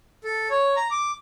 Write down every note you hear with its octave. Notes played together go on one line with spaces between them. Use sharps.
A4
C#5
A#5
D6